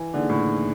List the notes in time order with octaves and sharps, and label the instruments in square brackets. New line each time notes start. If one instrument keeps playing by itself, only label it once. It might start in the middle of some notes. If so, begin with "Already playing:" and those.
Already playing: [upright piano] E3
[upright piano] D3 [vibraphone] A#3 D#4 G#4
[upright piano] A2